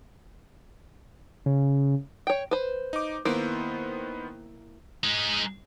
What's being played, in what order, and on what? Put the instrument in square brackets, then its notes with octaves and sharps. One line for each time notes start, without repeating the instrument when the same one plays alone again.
[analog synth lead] C#3
[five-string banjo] C#5 G5
B4 C5
[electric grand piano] D#4 D6
[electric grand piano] D#3 B3 C5 [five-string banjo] A#3 E4
[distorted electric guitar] G#3 D#4